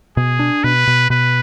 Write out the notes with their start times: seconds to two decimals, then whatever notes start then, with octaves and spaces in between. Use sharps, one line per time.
0.17 B2 G#4
0.39 D4
0.64 B2 B4
0.87 B2
1.10 B2 B4